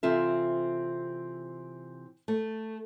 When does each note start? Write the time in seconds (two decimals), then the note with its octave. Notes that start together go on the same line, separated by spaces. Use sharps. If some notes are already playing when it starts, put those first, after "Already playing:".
0.03 C3 E3 C4 F4 A4 E5
2.28 A3